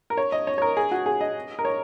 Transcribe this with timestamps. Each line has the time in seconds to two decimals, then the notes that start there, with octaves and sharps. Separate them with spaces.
0.10 A#4
0.17 C#5
0.32 D#5
0.47 C#5
0.58 C#5
0.62 A#4
0.77 G#4
0.91 F#4
1.06 G#4
1.21 D#5
1.59 A#4
1.65 C#5